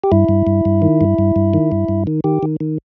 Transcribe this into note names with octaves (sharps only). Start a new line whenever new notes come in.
G4
G2 E4
G2
G2
G2
D#3
G2
G2
G2
D#3
G2
G2
D#3
D#3 G4
D#3
D#3